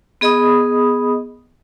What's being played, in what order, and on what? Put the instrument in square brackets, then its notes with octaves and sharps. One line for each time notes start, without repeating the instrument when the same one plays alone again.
[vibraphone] B3 G#4 D#5 B5 D#6